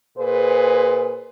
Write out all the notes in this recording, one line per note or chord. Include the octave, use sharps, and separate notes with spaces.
A#2 G#4 B4 C5